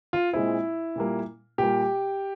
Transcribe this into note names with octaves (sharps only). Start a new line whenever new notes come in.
F4
A#2 G#3 C4 E4
A#2 G3 A#3
A#2 G3 A#3 G4